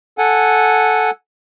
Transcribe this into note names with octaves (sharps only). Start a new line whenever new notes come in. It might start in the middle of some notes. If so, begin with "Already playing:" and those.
A4 F#5 G#5